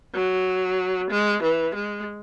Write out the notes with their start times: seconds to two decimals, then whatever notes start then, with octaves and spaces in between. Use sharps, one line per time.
0.14 F#3
1.10 G#3
1.43 E3
1.75 G#3